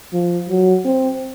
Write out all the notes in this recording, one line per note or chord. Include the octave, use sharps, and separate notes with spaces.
F3
F#3
C4